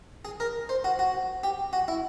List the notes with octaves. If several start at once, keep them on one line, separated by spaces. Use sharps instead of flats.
G#4
A#4
C5
F#4
F#4
G4
F#4
E4